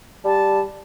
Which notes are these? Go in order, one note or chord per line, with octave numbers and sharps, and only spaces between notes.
G3 A5